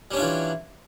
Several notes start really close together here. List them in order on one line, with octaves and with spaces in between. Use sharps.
G3 C#4 D4 F4 E3